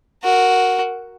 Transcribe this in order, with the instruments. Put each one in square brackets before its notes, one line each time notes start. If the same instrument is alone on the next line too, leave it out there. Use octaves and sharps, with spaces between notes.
[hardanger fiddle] F#4 A#4